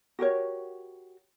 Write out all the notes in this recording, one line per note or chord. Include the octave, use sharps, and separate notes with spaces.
F#4 G4 A#4 C#5